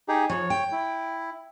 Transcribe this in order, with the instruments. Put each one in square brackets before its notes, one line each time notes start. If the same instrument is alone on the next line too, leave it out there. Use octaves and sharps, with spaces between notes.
[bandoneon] D#4 G4 G#4
[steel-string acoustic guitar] F3 [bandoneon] C#5
[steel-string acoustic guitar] G5
[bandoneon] E4